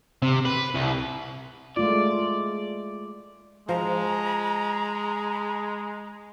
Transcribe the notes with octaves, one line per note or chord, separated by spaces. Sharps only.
C3
B4
C2
G#3 A3 F4 D5
F3 G#3 A#5